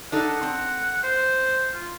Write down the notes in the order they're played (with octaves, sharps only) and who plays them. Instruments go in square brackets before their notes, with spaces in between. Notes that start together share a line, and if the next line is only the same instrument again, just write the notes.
[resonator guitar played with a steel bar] D4 D#4 A4 [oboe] F#5
[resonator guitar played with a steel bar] C4
[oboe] C5
F4